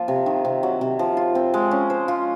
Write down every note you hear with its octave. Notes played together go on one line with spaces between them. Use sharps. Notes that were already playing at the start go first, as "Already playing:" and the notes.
Already playing: F3 A#3 F4
C3
D#3
C3
F#3
C3
F3
F4
C4
G#3
C#4
C5
F4